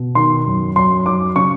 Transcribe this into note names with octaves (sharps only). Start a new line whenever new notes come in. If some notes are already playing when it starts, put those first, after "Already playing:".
Already playing: B2
D#3 C6
F#2
F#2 C6
F#3 D6
C#3 C#6